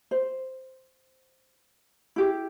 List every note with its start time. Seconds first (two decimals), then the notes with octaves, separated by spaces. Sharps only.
0.11 C5
2.16 E4 G4 G#4